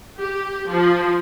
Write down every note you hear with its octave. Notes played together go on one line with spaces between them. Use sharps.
G4
F3